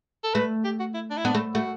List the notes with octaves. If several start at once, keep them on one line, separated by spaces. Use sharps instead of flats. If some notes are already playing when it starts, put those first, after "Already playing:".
A4
A3 B4
G4
F#4
E4
D4
E4
B3 D4
A3
A3 F#4